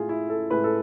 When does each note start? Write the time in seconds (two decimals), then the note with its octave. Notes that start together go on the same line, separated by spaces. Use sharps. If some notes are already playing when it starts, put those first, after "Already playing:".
Already playing: A2 G#3 F4 G#4
0.09 E4
0.30 A4
0.50 A2 G#3 B4
0.64 A4